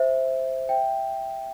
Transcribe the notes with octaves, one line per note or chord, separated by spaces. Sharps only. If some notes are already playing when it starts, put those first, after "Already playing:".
Already playing: C5 E5
E5 G5